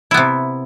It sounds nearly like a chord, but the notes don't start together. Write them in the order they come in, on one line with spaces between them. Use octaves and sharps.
E4 B3 C3